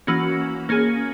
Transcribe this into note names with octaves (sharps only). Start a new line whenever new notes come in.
E3 A#3 C#4 F#4
A#3 C#4 G#4